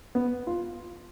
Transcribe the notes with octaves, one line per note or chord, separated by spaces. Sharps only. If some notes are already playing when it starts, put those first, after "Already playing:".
B3
F4